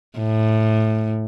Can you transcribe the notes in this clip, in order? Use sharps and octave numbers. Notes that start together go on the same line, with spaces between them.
A2